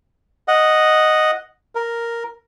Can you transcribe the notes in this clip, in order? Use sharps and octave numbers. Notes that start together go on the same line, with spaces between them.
D#5 F#5
A#4